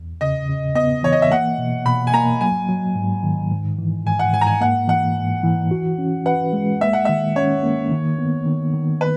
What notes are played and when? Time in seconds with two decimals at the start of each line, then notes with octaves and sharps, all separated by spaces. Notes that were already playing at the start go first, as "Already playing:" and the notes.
Already playing: E2
0.21 C#3 D#5
0.49 C#3
0.75 B3 D#5
1.03 E3 C#5
1.12 D#5
1.22 E5
1.31 A#3 F#5
1.58 B2
1.86 B2 B5
2.07 G#5
2.14 A#3 A#5
2.41 F#3 G#5
2.69 F#3
2.96 G#2
3.23 D#3
3.52 G#2
3.78 E3
4.06 G#2 G#5
4.19 F#5
4.33 G#2 G#5
4.41 A#5
4.47 G#5
4.61 A#3 F#5
4.88 E3 F#5
5.17 G#2
5.43 E3
5.71 F#4
5.98 C#4
6.26 B4 F#5
6.53 G#3
6.81 A#3 E5
6.93 F#5
7.05 D#3 E5
7.36 C#4 C#5
7.63 A#3
7.91 D#3
8.19 B3
8.46 D#3
8.73 D#3
9.01 B4